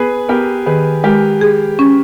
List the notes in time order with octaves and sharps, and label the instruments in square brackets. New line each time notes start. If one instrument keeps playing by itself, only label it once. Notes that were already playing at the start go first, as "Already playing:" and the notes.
Already playing: [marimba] B3 [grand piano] G#4 B4
[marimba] B3 [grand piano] G4 A#4
[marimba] D#3 [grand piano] G#4 B4
[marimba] G#3 [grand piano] G4 A#4
[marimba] G#4
C#4